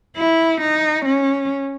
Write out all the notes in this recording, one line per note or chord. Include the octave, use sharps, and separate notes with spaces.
E4
D#4
C#4